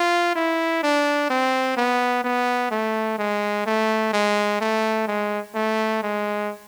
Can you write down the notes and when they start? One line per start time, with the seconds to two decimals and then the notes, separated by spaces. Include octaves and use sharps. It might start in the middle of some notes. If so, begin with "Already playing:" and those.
Already playing: F4
0.35 E4
0.83 D4
1.30 C4
1.77 B3
2.24 B3
2.72 A3
3.19 G#3
3.67 A3
4.13 G#3
4.61 A3
5.08 G#3
5.55 A3
6.03 G#3